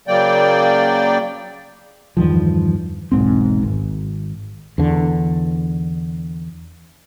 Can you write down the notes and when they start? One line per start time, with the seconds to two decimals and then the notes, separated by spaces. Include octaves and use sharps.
0.08 C#3 F#3 A#3 D5 G5
2.17 E2 G2 D#3 F3
3.12 E1 B1 G#2 C4
3.63 G#1
4.78 E2 D3